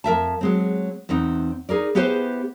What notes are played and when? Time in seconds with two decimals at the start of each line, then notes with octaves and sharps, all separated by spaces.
0.04 F2 A#4 E5 A5
0.41 F#3 G#3 C4
1.09 E2 B3 C4 D#4
1.69 D#4 G#4 A#4 D5
1.95 B3 E4 G4 G#4 B4 C5